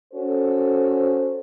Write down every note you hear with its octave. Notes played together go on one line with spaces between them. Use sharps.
C#4 F#4 A4 C5